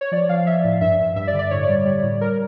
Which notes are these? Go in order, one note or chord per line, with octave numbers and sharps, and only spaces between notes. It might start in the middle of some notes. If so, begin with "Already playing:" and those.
C#5
F3 D5
F3 F5
F3 E5
A2
G2 E5
G2
G2 E5
D5
D3
D5
A2 C#5
D5
G3
G3
A2
G3 A#4